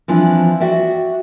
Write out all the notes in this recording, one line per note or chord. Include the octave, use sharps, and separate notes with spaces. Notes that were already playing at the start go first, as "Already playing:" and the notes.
E3 F3 C4 D4
F#4 D5 E5 G5